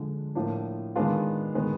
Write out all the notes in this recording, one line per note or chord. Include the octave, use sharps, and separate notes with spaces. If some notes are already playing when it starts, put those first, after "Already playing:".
Already playing: D3 F3 G#3
A2 F3 A#3 D4
D#3 G#3 B3 D4 F4
D#3 G#3 B3